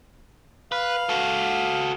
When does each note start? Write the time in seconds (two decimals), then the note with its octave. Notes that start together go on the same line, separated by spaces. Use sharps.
0.72 B4 F5
1.09 F#4 A4